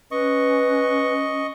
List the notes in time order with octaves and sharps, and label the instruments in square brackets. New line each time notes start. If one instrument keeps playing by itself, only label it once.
[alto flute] C#4 [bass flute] B4 [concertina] D#5 C#6